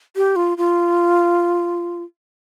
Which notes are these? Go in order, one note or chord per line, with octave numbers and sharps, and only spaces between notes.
G4
F4
F4